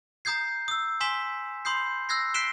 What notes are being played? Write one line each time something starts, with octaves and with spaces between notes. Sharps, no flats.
A#5 D#6 G6 G#6 C7
D#6 E6
G#5 C6 D#6 B6 E7 G7
B5 C6 D#6 G6 C7
E6 F#6 G#6 A#6 C7
F#6 B6 C7 D7 E7 G7